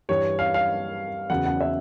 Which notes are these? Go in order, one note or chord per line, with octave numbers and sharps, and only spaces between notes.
G2 E3 G3 C#5
F5
F5
E2 C#3 F#3 F#5
F#5
E5